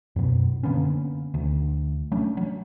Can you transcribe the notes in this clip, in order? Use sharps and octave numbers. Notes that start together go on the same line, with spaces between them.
F#2 B2
D3 A#3 B3 C#4
D2
F#3 A3 C#4 D4
F#3